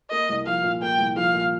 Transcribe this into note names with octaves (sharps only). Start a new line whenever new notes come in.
A#3 D#5
C2
F3 F5
A#2
A#3 G5
C2
F3 F5
A#2